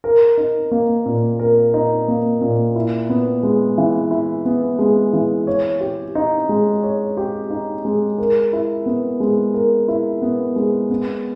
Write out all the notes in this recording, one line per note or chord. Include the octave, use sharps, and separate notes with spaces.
A#4
D#4
A#3
A#2
A#4
D#4
A#3
A#2
E4
B3
G#3
E3
E4
B3
G#3
E3
C#5
G4
D#4
G#3
C#5
G4
D#4
G#3
A#4
E4
B3
G#3
A#4
E4
B3
G#3
B3